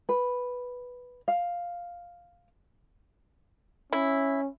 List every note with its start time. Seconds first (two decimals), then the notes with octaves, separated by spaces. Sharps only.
0.09 B4
1.28 F5
3.93 C#4 E4